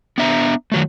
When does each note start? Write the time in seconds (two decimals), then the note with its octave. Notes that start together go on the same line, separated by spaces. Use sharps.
0.18 B3 D4 E5 A#5
0.72 D#3 F#3 A3